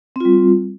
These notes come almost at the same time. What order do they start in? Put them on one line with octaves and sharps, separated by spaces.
C4 F4 G3